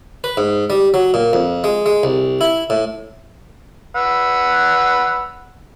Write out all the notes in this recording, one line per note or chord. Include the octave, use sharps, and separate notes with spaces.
B4
G#2
G3
F#3
A#2
F2
G#3
G#3
C2
E4
A2
B4 F#5 E6